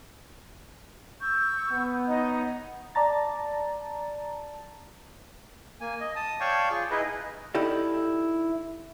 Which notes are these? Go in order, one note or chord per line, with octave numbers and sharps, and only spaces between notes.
C#6 E6 G6
B3
D#4 C#5 D#5
D5 A5 A#5 A6
A#3 G#5
D#5
A5 D#6
C#5 D5 F5 G5 A5 C#6
F4 G#4
D#4 E4 G#4 B4 D#5
D#4 E4 G4 A4 D5